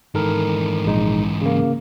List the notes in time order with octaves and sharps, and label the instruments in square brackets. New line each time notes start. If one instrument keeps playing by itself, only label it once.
[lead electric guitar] G#2 E3 [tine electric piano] D#3 A4 A#4
[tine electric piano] A#1 G#3 D#4
C#3 A#3